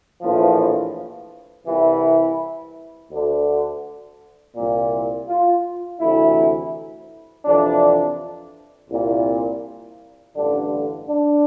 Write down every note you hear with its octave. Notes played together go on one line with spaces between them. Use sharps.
A#1 A2 E3 F3
C2 C3 E3 E4
D2 D3
C2 A#2
F4
D2 C3 E3 E4
F2 C3 E3 D4
C2 A#2
A1 G2 D3 D4
D4